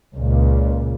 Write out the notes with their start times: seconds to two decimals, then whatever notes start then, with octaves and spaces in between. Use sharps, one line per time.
0.15 C#2 A#2